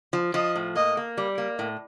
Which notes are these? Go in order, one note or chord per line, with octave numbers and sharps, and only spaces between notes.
F3
F3 D#5
A2
A#3 D#5
A#3
G3
A#3
A2